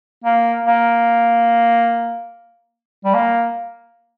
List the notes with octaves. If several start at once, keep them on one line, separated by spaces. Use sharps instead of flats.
A#3
A#3
G3
A#3